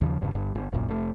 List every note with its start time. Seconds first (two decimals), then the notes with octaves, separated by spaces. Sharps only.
0.01 D#2 C#3 F3
0.21 E1 G2 C#3
0.35 G1 G2
0.55 G1
0.72 E1 A#1 F#2 A#2
0.89 F1 A3